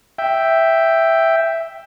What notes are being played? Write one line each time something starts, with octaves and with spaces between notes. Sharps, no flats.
E5 G5